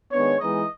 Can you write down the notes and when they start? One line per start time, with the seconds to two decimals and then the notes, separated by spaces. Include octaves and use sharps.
0.12 D#3 G#3 B3 D4 C#5
0.40 E3 G#3 B3 D#4 D#5